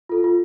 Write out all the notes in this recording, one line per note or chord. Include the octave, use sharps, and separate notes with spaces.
F4 A4
F4